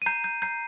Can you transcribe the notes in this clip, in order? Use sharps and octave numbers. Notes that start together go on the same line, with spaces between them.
D#7
A#5 G6 C7
G6
A#5 G6 C7